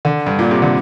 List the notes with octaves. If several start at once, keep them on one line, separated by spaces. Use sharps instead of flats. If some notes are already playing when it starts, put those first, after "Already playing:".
D3
G2
A#2
C3
D3